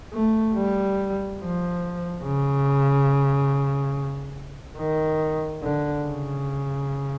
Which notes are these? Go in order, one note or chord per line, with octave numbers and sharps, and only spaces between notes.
A3
G3
F3
C#3
D#3
D3
C#3